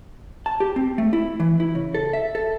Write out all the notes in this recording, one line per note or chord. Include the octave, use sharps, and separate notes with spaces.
A5
G4
C4
A3
E4
E3
E4
C#3
A4
E5
A4